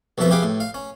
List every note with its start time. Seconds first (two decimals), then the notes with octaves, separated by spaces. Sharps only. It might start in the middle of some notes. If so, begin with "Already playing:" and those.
0.18 C2 F2 B2 F3 E5 C#6
0.30 E4 G4 G#4 B4 F5 D6
0.43 A2
0.60 F5
0.74 C#4